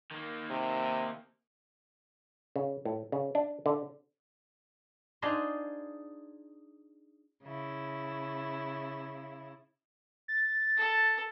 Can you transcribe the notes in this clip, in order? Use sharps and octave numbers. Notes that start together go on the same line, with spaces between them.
D#3 A#3
C3
C#3
A2
C#3
D4
D3
D4 D#4 F4 G#4 C5 D#5
C#3 E4
A6
A4